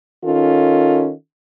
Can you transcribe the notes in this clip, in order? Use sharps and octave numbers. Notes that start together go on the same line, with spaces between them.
D#3 C#4 F4 A4